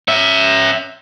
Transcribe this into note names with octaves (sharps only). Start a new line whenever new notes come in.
C#4 E5